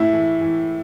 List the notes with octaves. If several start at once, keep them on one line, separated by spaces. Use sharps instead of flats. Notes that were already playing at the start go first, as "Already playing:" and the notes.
Already playing: A2 E4
E3
E3